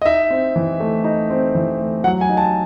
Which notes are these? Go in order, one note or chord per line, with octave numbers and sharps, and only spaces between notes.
D#5
D#4 E5
C4
E3
A3
D#4
C4
E3
A3
F#3 F#5
G#5
D#4
A5